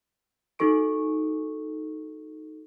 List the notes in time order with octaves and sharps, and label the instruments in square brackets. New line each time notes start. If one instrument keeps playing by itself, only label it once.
[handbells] D#4 F#4 A4 C#6 D7